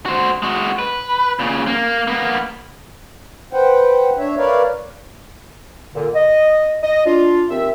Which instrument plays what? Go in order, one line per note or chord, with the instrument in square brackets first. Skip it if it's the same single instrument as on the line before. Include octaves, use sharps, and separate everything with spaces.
[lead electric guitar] F#4 C5
G#3 F#4
B4
A#2 C#3
A#3
A#3 B3
[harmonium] B4 C5 F#5 G5
D4 C#5 E5
A#4 B4 C#5 D5 F5
[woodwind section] A#2 D3
D#5
D#5
D4 F4
D#2 C4 E5